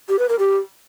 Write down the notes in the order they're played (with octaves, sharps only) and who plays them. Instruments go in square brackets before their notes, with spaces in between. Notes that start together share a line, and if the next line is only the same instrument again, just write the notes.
[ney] G4
B4
A#4
G4